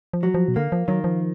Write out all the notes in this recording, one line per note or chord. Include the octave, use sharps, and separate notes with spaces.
F3
F#3
F3
B2
D3 A#3
F3
D#3 F#3
F3